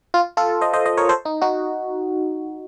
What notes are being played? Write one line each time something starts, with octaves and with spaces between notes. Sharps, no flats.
F4
F4 A4
C5 D#5
C5 D#5
C5 D#5
A#4 C#5
A4 C5
D#4
D#4 F#4